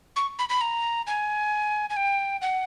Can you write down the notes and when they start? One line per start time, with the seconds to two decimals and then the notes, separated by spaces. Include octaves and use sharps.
0.16 C#6
0.39 B5
0.49 B5
0.61 A#5
1.07 G#5
1.90 G#5
1.97 G5
2.41 F#5